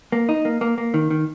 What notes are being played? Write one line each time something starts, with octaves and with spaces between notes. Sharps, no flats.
A#3
D#4
A#3
A#3
A#3
D#3
D#3